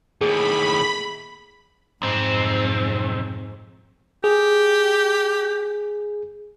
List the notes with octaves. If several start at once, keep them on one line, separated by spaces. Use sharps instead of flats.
D#2 A2 G#4 B5
B1 F2 G#2 C4
G4 G#4